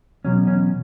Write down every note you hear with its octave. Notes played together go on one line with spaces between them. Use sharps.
E2 B2 F#3 C#4
C#4